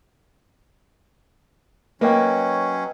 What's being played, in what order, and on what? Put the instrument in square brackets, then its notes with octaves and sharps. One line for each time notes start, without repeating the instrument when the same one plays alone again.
[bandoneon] F#3 C#4 [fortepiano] A#3 [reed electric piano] B4 D#5 G5